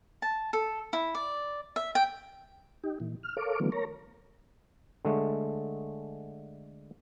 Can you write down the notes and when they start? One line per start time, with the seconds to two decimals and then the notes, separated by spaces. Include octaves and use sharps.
0.22 A5
0.53 A4
0.93 E4
1.15 D5
1.76 E5
1.95 G5
2.84 D#4 G4
3.00 A#2 E3
3.23 F6
3.37 A4 A#4 C#5 F5 D6
3.60 D3 E3 F#3 A3 B3
3.72 A#4 C#5 A#5
5.05 D3 G#3 A3